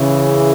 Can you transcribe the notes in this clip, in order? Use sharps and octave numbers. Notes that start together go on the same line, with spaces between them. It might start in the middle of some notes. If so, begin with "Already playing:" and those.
Already playing: C#3 E3